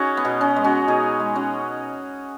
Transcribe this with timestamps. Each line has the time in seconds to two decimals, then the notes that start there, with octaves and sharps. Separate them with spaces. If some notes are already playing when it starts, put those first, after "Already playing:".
Already playing: C#4 D#4 F#4 G#4
0.17 B3
0.25 B2
0.41 C#4
0.56 G#3
0.64 C#4 F#4
0.88 B2 D#4 G#4
1.20 G#3
1.35 C#4 F#4